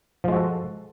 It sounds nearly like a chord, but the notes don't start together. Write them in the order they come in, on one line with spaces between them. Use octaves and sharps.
F3 G#3 F#4 A4